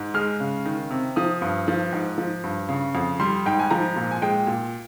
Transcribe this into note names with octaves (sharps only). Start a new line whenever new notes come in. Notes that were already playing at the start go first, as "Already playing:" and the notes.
Already playing: G#2
G#3 F6
C#3
D#3
C3
F3 D#6
G2
F3
G#2
F3
G2
C#3
F2
G3 C6
G#2 G5
G#5
F3 A#5
A#2
G#5
G#3 G5
A#2